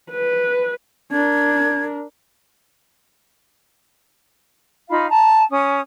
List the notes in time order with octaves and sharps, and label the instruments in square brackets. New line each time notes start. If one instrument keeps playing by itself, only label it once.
[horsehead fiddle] B4
[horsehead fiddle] D4 A#4 [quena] G#6
[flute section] D#4 F4 F5 B5
A5 A#5
C#4 D#6